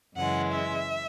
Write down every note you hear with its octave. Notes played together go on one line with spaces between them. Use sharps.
F#2 C#3 E3 G#3 F#5
E5